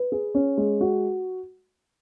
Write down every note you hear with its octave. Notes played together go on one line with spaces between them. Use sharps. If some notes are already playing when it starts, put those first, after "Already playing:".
Already playing: B4
G#4
C#4
G#3
F#4